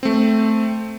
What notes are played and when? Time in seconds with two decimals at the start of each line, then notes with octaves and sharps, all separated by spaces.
0.03 A3 C4